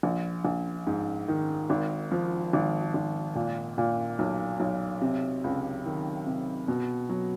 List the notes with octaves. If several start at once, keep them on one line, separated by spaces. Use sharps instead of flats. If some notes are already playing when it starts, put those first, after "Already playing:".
A#1
A#1
G#2
D#3
G#1
F3
G#1
G#1
A#2
A#2
B1
B1
C3
C#2
D#3
C3
B2
F#3